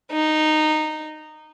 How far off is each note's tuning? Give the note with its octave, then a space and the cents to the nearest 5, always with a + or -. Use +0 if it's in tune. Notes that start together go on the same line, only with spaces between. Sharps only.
D#4 -10